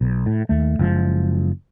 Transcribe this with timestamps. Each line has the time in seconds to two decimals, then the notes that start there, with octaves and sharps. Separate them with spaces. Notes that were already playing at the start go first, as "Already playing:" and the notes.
0.01 B1
0.26 A2
0.49 D#2 A3
0.79 F#1 F3 G#3